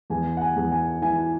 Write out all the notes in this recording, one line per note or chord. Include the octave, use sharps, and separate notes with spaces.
E2 G#5
F#5
G#5
E2
G#5
E3 G#5